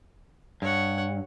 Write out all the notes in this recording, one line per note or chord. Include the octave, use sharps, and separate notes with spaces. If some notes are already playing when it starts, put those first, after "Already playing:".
G2 C#5 F#5